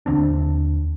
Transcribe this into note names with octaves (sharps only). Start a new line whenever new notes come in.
D#2 D3 C4 D4